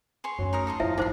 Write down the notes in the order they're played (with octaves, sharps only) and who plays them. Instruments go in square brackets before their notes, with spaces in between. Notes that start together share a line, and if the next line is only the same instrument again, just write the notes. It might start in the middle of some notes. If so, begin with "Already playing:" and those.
[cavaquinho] G#4 C#5 C6
[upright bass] F#2 A3 [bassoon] F#3
[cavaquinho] D#4 A#4 D#5
A4 D#5 C6
[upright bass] F2 A2 [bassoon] F3 [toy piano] E4 E5
[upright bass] G#1 [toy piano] D#4 F4 C5 [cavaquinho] D5 C6